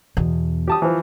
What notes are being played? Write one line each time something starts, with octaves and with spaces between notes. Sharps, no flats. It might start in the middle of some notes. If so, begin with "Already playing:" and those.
E2 B2
G4 A5 D#6
E3 F3